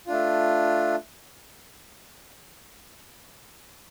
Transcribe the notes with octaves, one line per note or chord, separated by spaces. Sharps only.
A3 D4 F4